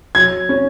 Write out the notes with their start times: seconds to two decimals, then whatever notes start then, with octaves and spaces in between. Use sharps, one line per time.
0.15 F#3 G#6
0.49 C#4